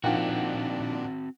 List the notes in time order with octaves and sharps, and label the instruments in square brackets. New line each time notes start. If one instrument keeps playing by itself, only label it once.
[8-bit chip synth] A#2 D4 [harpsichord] D#3 F3 [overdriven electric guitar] C4 F#4 [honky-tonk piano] F#5 G5